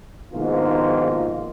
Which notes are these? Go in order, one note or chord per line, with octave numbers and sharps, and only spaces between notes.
A#1 G#2 B2 D#3 A#3 F4